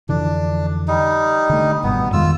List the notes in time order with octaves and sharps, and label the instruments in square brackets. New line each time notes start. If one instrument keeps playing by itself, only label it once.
[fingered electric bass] F2 D3 E3 [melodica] D4
[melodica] G3 D#4
[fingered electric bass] D3 A3
[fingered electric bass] G#1 G2 B2 [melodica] B3
[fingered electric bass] F2 D#3 G#3 [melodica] F4 E6